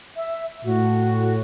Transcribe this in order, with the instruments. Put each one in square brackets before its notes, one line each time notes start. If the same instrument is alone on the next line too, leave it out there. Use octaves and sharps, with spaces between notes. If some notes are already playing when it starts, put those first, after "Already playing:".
[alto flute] E5
[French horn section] A2 [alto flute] F#4